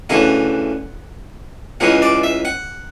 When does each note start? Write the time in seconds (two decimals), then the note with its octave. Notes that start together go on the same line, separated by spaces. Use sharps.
0.09 D2 C#3 E3 F#5
1.80 C#2 C#3 E3 F#5
2.02 D5
2.23 E5
2.45 F#5